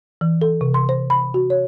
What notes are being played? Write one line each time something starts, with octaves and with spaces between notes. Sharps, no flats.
E3
A4
C3
C6
C5
B5
F#4
C#5